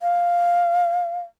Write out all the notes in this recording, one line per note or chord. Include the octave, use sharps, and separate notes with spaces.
F5